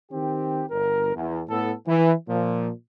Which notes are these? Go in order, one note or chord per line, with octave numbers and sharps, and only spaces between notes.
D#3 C4 G4
G1 A#4
E2
A2 B3 A4
E3
A#2 F3